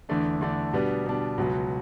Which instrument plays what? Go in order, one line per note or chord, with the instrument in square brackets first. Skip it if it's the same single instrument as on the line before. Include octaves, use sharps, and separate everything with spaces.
[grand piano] E2 D3 A3 D4
E2 D3 A3 D4
B2 G3 B3 D4
B2 G3 B3 D4
C#2 B2 F#3